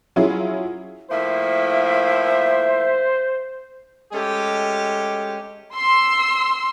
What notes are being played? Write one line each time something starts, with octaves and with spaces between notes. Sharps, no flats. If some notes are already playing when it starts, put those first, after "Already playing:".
F#3 C#4 E4 F4 G#4
A2 F3 A#3 C5 E5
G#3 A3 C#4 G4
C6 E6